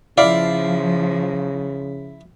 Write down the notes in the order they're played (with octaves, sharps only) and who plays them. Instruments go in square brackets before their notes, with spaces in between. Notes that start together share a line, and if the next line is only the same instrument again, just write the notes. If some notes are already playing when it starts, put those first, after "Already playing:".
[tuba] C#3 [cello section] F3 [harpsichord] E4 [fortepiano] D5 F5